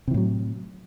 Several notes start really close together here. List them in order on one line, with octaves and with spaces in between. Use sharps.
C3 E3 A2 F#3